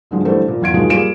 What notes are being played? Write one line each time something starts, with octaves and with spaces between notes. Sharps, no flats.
B1 G2 D3 F3 G#3
D3 E3 G3 A3 C5
A#2
E2 F4 G#6 D7
D#3 F3 G#3 F4 F#4
G3 A#3 F4 G#4 D7 E7